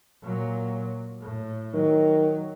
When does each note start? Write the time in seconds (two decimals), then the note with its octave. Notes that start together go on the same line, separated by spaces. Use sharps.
0.22 A#2 F#3
1.20 A2
1.74 D#3 F#3